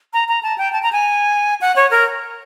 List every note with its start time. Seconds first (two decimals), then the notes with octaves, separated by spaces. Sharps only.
0.13 A#5
0.28 A#5
0.43 A5
0.58 G5
0.73 A5
0.83 A#5
0.93 G#5
1.61 F#5
1.76 C#5
1.91 A#4